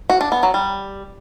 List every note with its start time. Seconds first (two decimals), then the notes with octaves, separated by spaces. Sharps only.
0.10 F#4
0.21 D4
0.32 B3
0.43 F#3
0.54 G3